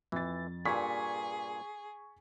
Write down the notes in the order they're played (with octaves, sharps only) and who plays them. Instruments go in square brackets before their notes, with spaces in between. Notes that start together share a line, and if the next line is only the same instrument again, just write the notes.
[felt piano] F2 A6 [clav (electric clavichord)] E3
[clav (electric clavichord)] G2 A#2 [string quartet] G#4 [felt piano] C#6 G#6 B6